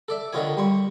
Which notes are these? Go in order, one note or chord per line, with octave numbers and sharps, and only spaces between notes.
A4 D5 E5
D3 D#3 D#4 F4 C#5 G#5
G3 C6 C#6